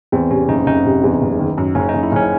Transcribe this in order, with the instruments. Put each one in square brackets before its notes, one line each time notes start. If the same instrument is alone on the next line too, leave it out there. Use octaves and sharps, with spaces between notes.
[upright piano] E2 [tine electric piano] C4
[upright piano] C3 [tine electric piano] C#4
[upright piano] F#1 [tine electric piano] D#4
[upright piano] F#1 [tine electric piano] D#4
[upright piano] C3
E2
F#1
D#3
F#2
[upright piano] F#1 [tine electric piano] C#4
[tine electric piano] D#4
[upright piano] F#1
[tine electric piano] E4
[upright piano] F#1 [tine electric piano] C#4